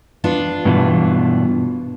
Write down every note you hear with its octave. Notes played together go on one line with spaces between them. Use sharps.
B3 D4 F4
G2 B2 E3